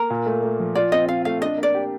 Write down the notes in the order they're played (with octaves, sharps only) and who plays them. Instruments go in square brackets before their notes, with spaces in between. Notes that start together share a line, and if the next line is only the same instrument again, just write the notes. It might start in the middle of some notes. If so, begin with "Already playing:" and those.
Already playing: [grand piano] A#3 [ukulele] A#4
[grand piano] A#2
A3
A3
F3
[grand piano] F4 [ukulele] D5
[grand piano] C4 [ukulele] D#5
[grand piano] C4 [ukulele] F5
[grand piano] A3 [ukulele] F5
[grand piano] D4 [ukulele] D#5
[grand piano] A#3 [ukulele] D5
[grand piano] G4